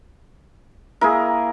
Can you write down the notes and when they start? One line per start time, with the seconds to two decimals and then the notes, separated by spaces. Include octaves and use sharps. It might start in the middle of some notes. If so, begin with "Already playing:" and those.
1.01 A#3 E4 G#4 A#4